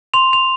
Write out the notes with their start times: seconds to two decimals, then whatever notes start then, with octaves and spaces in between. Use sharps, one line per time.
0.14 C6 F7
0.33 F7